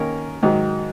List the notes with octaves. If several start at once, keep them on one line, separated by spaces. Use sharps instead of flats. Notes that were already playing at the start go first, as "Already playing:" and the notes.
Already playing: D#3 A#3 C#4 A#4
G#2 D#3 F#3